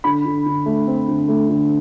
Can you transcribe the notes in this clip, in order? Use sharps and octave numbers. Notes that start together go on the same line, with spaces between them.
D3 B5
D3
D3
A3
C4
D3
A3
D3